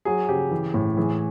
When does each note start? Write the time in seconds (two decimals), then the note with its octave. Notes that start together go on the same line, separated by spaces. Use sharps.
0.05 F#3 G#4
0.29 C#3 G4
0.51 E3
0.74 A2
0.97 E3 G#4